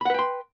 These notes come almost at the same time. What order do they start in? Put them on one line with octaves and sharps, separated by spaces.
B5 F#5 B4 G5 C6